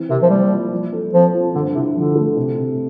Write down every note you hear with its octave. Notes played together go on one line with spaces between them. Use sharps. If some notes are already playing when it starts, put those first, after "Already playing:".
Already playing: E3 C4
C3 A#4
F3
G3 A#3
F4
F3
A4
F3 C4
F4
G2 D3
C3 E4
D3 F3
A3
C3
C3